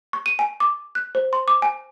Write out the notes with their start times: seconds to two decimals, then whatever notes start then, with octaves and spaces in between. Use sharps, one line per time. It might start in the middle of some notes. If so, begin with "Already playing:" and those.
0.13 C#6
0.26 D#7
0.39 G#5
0.60 D6
0.95 F#6
1.15 C5
1.33 C6
1.48 D6
1.62 G#5